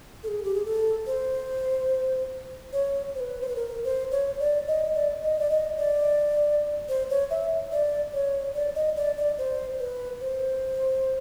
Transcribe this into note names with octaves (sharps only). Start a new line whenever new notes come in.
A4
G#4
G4
G#4
A4
C5
C#5
C5
B4
C5
B4
A#4
C5
C#5
D5
D#5
D5
D#5
D5
D#5
D5
C5
C#5
E5
D5
C#5
D5
D#5
D5
D5
C5
B4
C5